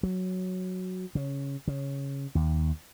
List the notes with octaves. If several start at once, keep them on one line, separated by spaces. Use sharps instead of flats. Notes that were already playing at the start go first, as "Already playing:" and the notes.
F#3
C#3
C#3
D#2